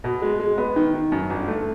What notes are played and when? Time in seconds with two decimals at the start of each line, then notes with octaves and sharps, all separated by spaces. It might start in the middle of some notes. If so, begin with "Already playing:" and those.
0.04 B2
0.22 G#3
0.40 G#3
0.58 B3
0.76 D#3
0.94 D#3
1.12 F#2
1.30 G1
1.48 A3